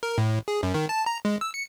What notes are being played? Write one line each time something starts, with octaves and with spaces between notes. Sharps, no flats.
A#4
A2
G#4
F#2
D#3
A5
A#5
G#3
E6
C#7